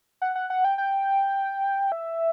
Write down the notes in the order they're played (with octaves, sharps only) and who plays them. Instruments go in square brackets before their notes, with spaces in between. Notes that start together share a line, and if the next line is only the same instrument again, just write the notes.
[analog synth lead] F#5
F#5
F#5
G5
G5
E5